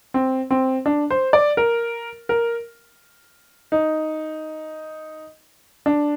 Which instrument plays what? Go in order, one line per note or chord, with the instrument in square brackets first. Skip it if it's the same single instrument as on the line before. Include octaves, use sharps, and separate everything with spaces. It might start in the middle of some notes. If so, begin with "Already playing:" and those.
[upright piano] C4
C4
D4
C5
D5
A#4
A#4
D#4
D4